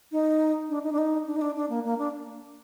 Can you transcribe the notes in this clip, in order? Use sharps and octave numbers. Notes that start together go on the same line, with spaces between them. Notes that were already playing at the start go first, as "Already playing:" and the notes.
D#4
D4
D#4
D4
D#4
D4
D#4
D4
D4
A#3
A#3
D4